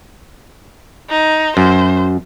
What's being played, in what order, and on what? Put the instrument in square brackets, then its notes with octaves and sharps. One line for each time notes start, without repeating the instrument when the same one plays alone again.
[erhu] D#4
[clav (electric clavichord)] F#2 [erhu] C5